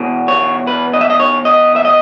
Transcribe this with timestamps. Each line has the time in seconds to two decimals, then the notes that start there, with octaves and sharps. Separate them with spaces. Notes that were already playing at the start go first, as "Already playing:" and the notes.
Already playing: E2 B2
0.28 C#5
0.67 B4
0.93 D#5
1.01 E5
1.10 D#5
1.20 C#5
1.45 D#5
1.76 E5
1.85 D#5